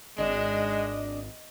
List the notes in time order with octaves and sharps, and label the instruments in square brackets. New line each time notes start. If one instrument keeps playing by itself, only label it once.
[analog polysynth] G#1 [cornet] G#3 [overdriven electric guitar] D4 [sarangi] D#5